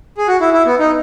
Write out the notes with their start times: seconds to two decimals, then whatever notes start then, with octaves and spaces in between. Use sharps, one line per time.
0.18 G#4
0.28 F#4
0.41 E4
0.53 E4
0.66 B3
0.79 D#4